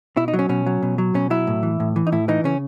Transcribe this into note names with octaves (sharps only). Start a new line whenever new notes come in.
B2 E4
D#4
F#3
C#4
B2 C#4
F#3
B2
F#3
B2 C#4
F#3 E4
A2
E3
A2
E3
D#4
A2 E4
E3 D#4
C#3 C#4